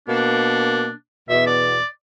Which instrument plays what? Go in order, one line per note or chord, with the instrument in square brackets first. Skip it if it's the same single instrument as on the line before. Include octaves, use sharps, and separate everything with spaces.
[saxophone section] B2 A#3 [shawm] D4
[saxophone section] E2 B2 [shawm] E5
[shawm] D5